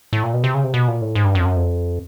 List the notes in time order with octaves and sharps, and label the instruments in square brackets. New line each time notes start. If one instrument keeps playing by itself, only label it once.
[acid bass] A2
A#2
B2
C3
C#3
C3
B2
A#2
A2
G#2
G2
F#2
F2
F#2
F2